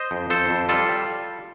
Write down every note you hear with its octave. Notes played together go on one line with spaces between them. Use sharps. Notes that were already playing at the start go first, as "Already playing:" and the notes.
Already playing: C5 D#5
F2
F2 A4 C5
F2
G3 F4 A4
G3